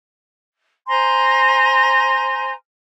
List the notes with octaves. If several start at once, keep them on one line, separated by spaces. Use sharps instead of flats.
C5 G#5 A#5 C6